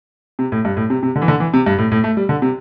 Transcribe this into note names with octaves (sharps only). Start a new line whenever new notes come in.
C3
A2
G2
A2
C3
C3
D3
E3
D3
E3
C3
G2
A2
A2
A3
G3
D3
C3